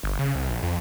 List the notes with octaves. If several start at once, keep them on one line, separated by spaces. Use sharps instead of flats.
G1
C#3
C2
A#1
F2